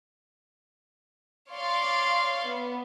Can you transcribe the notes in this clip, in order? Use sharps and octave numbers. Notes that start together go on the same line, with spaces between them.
C#5 D5 F5 C6
B3